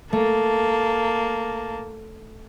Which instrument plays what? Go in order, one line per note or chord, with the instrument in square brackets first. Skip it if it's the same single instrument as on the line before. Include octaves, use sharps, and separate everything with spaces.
[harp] A3 [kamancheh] A#3 A5